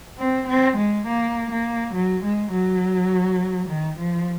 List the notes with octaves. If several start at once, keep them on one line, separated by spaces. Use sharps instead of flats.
C4
C4
G#3
A#3
A#3
F#3
G#3
F#3
D#3
F3